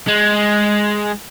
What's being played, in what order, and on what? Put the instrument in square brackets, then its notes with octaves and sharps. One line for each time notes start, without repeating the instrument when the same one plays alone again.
[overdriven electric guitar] G#3